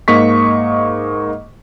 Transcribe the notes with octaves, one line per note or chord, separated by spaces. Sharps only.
G#2 A#3 D#5 C#6 B6